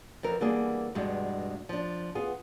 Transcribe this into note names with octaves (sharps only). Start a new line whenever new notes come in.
F2 E3 A#4
E3 G3 A#3 B3 D4 G#4
E2 G2 B2 G#3
F3 D4
B3 F4 G#4